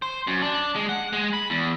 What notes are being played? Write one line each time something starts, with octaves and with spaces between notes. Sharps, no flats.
C5
F#2
D4
G#3
F#5
G#3
B5
E2